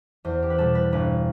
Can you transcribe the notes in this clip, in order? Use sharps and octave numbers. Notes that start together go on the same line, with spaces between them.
E2 C5
G4
B4
B2 G3 A4
B4
G1 B4